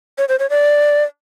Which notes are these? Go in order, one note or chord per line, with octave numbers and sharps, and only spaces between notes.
C#5
C5
C#5
D5